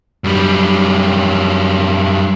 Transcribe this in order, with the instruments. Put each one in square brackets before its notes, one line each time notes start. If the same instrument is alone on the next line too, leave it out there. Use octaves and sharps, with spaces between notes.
[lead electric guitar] F#2 G3